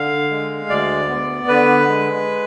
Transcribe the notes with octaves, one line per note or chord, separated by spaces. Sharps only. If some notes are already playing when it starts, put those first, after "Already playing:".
Already playing: D3 F5
G#3
D2 D5
B3
D3 B4
G#3